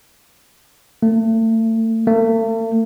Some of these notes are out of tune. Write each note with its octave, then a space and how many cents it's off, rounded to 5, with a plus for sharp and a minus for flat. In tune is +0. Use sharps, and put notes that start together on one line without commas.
A3 +35
A3 +45